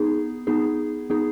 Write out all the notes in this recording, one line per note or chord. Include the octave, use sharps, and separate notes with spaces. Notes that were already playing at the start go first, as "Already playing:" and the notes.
Already playing: B3 D#4 G#4
B3 D#4 G#4
B3 D#4 G#4